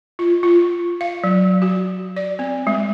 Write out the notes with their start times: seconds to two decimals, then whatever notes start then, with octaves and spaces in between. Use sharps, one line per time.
0.19 F4
0.43 F4
1.01 F5
1.24 F#3
1.62 F#4
2.17 D5
2.39 C4
2.67 G#3